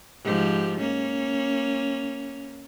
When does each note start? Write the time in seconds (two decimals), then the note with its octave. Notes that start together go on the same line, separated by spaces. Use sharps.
0.23 G#2 F3 G4
0.79 A#3 C#4